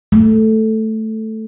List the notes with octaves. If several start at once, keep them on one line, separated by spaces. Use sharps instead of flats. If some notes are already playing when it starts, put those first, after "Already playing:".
A3